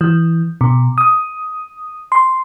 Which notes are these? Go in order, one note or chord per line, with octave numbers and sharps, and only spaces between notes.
E3
B2
D#6
C6